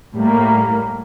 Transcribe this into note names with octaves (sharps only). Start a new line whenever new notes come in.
A2 G3 A#3